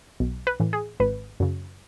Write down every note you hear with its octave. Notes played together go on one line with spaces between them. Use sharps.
B1
B4
A2 E3
G#4
G#1 B4
F#2 C#3